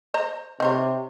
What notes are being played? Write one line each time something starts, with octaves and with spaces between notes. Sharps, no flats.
C5 D#5 A#5
C3 D#4 C5 C#5